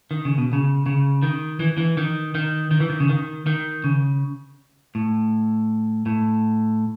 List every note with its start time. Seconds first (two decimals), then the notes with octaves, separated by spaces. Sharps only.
0.11 D#3
0.25 C#3
0.38 B2
0.53 C#3
0.86 C#3
1.22 D#3
1.60 E3
1.78 E3
1.97 D#3
2.35 D#3
2.71 D#3
2.80 E3
2.90 D#3
3.00 C#3
3.09 D#3
3.47 D#3
3.84 C#3
4.95 A2
6.06 A2